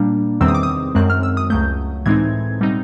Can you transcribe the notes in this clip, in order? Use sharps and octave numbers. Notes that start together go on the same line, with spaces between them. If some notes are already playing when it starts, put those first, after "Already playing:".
Already playing: A#2 G3 A#3 D4
E2 C3 D#3 G3 C4 E6
D#6
D6
D#6
F#2 D#3 G#3 C4 F#6
F6
E6
D#6
C#2 C#3 F#3 A3 G6
A2 E3 G#3 C4 D#4 G#6
B2 G3 C4 D#4